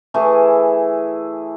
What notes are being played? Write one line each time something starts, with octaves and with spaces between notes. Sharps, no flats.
E3 A3 E4 G#4